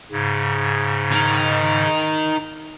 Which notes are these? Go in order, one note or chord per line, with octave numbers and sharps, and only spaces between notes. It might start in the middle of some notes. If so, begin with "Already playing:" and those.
G#2 C#3
D#4 A#4